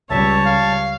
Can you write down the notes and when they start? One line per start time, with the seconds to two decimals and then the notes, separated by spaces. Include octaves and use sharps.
0.10 C#2 G3 C#5 E5 A5
0.46 F5